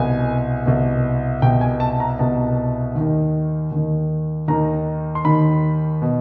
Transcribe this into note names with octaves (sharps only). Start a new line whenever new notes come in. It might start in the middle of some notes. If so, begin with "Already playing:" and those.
Already playing: C2 B2 G#5
C2 B2
C2 B2 G5
G#5
A5
A#5
C2 B2 A5
D#2 D#3
D#2 D#3
D#2 D#3 A#5
C6
D#2 D#3 B5
B2